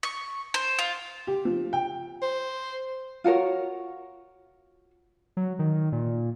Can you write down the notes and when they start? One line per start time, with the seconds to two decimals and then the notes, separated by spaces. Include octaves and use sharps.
0.03 C#6
0.54 C5
0.79 F4
1.27 G4
1.45 F3
1.73 G5
2.22 C5
3.24 F4 F#4 A#4 C#5
5.37 F#3
5.59 D#3
5.92 A#2